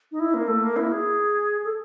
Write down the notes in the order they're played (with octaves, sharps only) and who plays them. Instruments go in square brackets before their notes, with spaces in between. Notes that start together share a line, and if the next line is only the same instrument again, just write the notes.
[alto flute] D#4
E4
A#3
A3
A#3
E4
G#4
A4